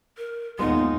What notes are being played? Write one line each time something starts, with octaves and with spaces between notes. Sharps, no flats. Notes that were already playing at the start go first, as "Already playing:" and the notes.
A#4
D#2 G#3 B3 D#4 F4 F#5